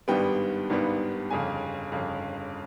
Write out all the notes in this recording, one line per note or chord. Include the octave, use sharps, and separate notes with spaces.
G#1 G2 D#3 G3 B3 G5
G#1 G2 D#3 G3 B3
G1 F2 C#3 G#5
G1 F2 C#3